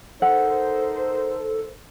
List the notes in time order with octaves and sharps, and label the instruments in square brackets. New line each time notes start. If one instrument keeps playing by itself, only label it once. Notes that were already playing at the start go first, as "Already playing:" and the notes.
[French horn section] D#4 A#4 C5 [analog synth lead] A4 [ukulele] F#5